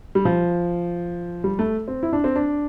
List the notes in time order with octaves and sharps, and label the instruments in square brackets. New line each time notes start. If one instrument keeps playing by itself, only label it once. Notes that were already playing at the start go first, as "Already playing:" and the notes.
[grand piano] G3
F3
G3
A3
C4
E4
D4
C4
D4